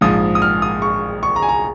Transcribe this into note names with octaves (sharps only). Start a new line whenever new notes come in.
A#1 G#2 F3 D#6
D#6
F6
D#6
C#6
C#6
A#5
G#5
A#5